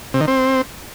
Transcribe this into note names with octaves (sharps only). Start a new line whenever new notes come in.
C3
D#3
C4